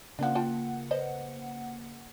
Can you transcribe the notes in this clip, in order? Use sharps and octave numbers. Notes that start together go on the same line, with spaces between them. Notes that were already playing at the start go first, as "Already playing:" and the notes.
C#3 F3 A#3 D4 F#5
F4 G5 A5
B4 C5 D#5